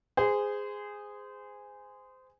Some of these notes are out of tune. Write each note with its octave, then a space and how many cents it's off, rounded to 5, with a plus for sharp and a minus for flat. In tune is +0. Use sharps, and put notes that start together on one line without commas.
G#4 -10 C5 -25